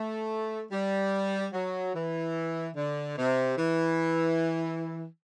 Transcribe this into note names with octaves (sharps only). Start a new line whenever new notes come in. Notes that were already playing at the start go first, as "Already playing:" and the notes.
Already playing: A3
G3
F#3
E3
D3
C3
E3